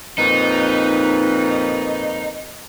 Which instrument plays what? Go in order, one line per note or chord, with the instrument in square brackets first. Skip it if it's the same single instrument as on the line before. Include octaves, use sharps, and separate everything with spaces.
[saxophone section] F2 A#2 B4 [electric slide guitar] D#4